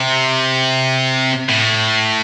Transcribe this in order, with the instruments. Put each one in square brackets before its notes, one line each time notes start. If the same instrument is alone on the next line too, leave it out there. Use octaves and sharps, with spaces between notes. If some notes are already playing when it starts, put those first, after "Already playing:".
Already playing: [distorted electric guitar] C3
A2